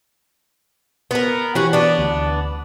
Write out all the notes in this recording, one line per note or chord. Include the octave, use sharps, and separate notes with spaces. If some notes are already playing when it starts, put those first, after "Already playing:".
B3 A#4
E3 C#4 F#4 G4
B3 D4
D2